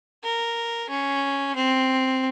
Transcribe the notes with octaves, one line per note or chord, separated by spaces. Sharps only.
A#4
C#4
C4